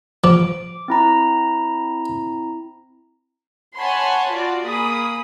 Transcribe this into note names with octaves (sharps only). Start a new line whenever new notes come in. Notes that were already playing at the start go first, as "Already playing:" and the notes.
F3 D6
C4 E4 A#5
C#5 F#5 G#5 A5 B5 C6
F4 F#4 D5
A#3 G#4 B5 D#6